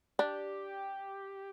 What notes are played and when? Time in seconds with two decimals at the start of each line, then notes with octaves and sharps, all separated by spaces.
0.19 D4 G4